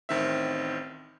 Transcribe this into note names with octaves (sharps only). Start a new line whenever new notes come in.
A1 D#3 C4 E5